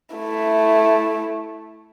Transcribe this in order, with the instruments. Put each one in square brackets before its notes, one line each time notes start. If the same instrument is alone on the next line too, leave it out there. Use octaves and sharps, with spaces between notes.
[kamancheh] A3 E4